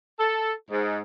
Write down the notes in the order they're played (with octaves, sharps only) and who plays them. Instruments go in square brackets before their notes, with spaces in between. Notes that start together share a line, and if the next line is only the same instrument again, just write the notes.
[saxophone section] A4
G#2